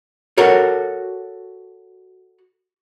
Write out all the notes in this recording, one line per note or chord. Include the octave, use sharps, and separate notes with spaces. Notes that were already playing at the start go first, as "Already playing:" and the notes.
F#4 A4 A#4 C#5